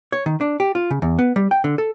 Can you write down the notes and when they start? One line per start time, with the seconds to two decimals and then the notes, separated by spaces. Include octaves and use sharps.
0.12 C#5
0.26 D#3
0.41 D4
0.60 G4
0.75 F4
0.91 C#3
1.02 E2
1.19 B3
1.36 G3
1.51 G5
1.64 D3
1.78 A4